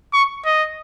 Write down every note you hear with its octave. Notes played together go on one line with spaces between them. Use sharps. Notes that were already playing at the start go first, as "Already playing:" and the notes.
C#6
D#5